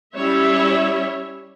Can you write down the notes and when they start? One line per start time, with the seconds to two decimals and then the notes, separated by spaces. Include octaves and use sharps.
0.14 G3 C#4 E4 C#5 E5